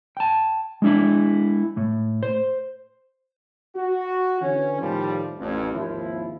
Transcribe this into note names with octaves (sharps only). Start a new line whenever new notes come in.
G5 A5
G#3 D4 E4
A2
C5
F#4
D3 E3 C#4
A2 D#3 F3 G3
A1 F2
G#1 D#2 F3 E4